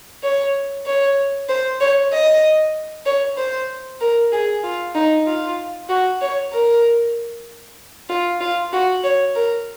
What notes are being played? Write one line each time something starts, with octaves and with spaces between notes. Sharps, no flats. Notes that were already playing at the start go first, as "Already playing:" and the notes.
C#5
C#5
C5
C#5
D#5
C#5
C5
A#4
G#4
F4
D#4
F4
F#4
C#5
A#4
F4
F4
F#4
C#5
A#4